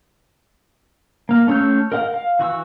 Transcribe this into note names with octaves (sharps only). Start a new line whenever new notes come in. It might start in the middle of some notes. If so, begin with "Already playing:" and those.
A#3 F5
A3 C#4 C#5 E6 G6
A#4 D#5 F5 F#5
F5
E3 F#4 C#6 E6